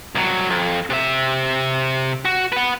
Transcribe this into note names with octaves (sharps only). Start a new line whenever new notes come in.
C2 F#3
F2
C3 E5
F#4
B4 F#5